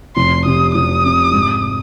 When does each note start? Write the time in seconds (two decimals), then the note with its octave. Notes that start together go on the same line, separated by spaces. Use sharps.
0.16 F1 C6
0.46 C3 D#6
0.75 F1 D#6
1.04 C3
1.34 G#2